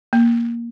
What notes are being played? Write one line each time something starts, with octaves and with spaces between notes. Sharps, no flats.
A#3